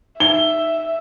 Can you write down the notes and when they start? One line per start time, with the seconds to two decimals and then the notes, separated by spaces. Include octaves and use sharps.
0.20 D#4 E5 G7